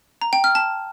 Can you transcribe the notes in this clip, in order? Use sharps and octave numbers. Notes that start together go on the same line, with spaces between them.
A#5
G5
F6
A5